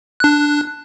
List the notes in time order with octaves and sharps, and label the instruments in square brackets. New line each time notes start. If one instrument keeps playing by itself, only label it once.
[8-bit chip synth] D4 F#6